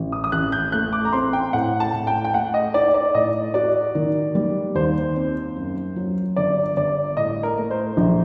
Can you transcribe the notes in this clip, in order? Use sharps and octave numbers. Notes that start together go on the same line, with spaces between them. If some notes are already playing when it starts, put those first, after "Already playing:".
Already playing: A1
D#6
D#6
A1 F#6
G6
A3 F#6
D6
A#5
C4 C6
G5
A2 F#5
A5
A2
G5
G5
A3 F#5
D#5
D#4 D5
D5
A2 D#5
F#4 D5
D#3
G3
D#2 C5
C4
F#2
F#3
G1 D5
G1 D5
A2 D#5
A#4
A3
C5
A#1